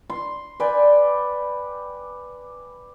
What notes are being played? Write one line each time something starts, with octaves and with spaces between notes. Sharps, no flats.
C6
B4 D5 G5 G#5